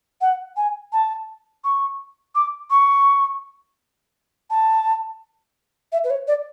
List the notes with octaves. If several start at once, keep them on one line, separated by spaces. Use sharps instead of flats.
F#5
G#5
A5
C#6
D6
C#6
A5
E5
B4
C#5
D5